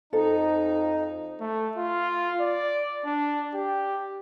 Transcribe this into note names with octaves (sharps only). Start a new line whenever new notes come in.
F2 D#4 A4
A3
F4
D5
D4
G4